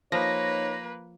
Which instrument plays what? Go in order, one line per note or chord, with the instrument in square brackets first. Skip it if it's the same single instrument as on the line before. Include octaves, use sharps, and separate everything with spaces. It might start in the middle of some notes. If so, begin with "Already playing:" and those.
[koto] F3 [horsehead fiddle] A#3 B4 [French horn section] D#4 C#5 [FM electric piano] A#6